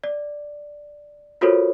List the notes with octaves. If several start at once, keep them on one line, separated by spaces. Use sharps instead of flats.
D5
F4 F#4 A4 A#4 C5 C#5